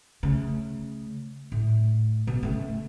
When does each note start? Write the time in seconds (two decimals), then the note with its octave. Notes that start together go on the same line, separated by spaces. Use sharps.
0.23 C#3 A3
1.52 A2
2.27 B2
2.43 C#3 A3